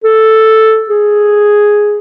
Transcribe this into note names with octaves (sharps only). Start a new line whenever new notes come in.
A4
G#4